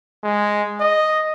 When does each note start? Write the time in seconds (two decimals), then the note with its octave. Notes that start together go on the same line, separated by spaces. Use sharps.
0.24 G#3
0.80 D#5